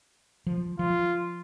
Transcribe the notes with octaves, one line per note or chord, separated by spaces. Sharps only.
F3
F3 F4